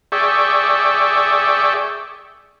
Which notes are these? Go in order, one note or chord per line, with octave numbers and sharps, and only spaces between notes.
G#4 D5 E5 G5 C#6